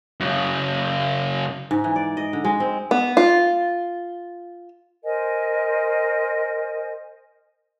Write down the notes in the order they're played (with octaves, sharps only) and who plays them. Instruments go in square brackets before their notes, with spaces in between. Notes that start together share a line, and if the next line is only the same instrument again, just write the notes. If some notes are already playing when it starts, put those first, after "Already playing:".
[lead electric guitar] F#2 C#3
[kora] G#2
E3
D5
D#5
D3
G#3
C4
[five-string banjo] B3
F4
[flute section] A#4 C5 D#5 G#5